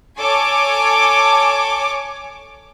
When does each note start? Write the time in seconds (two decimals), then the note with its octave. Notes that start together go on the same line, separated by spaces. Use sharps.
0.19 A4 C#5 G#5 D6